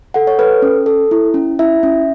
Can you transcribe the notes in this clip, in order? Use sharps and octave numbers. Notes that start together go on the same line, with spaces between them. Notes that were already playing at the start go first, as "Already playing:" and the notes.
A4 F#5
C#5
A4 B4
C#4
A4
E4
C#4
E4 E5
C#4